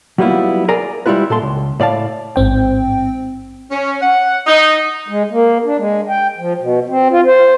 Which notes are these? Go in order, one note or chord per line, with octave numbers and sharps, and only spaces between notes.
F#3 G3 A#3 B3 E4 F4
G#4 A#4 D5 G#5 A#5
G3 G#3 E4 F4 B4
A#2 A4 A5 C6
C#2
A2 D5 F5 A5
A1 G#2 C4 G5
C#4
F#5
D#4
G#3
A#3
D4
G#3
G5
F3
B2
C4
F4
C5